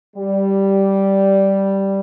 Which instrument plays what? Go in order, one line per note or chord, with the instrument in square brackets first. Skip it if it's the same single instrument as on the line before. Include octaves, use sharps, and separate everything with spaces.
[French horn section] G3